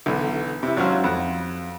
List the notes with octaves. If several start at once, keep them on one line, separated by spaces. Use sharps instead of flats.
B1 D3 E3
C3 E4
G#1 F#3 C#4 F#4 C5 F5
F2 F#5